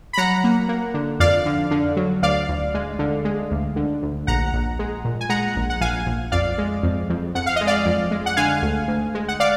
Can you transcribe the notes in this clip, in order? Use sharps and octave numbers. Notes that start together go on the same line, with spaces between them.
B5
F#3 F#5 A#5
A#3
A#3
D3
F2 D5 F5
D3
D3
F#3
D2 D5 F5
D2
G#3
D3
G#3
D2
D3
D2
A#1 F#5 A#5
A#1
G#3
A#2
G#5
G#3 F#5 A#5
A#1
F#5
A#1 F5 G#5
A#1
F2 D5 F5
G#3
F2
F2
F2 F#5
F5
G#3 D#5
D5 F5
F2
G#3
F#5
D3 F5 G#5
D2
D2
G#3
F#5
D5 F5